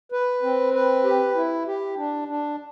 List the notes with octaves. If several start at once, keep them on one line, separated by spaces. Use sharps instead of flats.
B4
C4
B4
G4
E4
G4
D4
D4